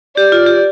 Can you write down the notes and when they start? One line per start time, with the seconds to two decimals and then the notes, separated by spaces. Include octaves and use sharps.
0.17 G4 D5
0.32 F4
0.46 G4